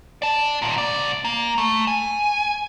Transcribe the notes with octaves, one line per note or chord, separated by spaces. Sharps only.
D5 A5
D#2 A#2
C2 D5
A#3
A3
G#5